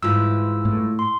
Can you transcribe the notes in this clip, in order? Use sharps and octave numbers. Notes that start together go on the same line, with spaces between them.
G#2 E3 E4 F4 E6
A2
C6